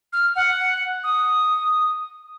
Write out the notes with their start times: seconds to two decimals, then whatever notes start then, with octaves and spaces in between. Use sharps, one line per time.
0.13 F6
0.35 F#5
1.03 D#6